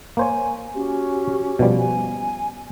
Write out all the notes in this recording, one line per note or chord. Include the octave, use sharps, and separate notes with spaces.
A#3 C5 C#5 G#5
C#4 F#4 G4
B2 F3 G3
G#5